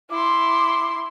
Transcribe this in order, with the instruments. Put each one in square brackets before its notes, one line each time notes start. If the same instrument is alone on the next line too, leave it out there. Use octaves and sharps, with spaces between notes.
[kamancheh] E4 C6 [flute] D6